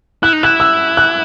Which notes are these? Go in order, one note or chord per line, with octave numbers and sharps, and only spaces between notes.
E4 F#6
D#4
E4 F#6
E6
F#6